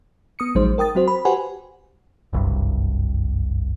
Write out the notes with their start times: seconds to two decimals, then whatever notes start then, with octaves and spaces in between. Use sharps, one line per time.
0.39 B3 D#6 C#7
0.55 A1 F3 F#3 G#3 D#4 C5
0.78 A#4 G5 D#6 A6
0.95 F#3 C4 F#4 C5
1.08 B5
1.25 F#4 G4 B4 C5 F#5 G#5
2.33 F#1 C2 G2 C3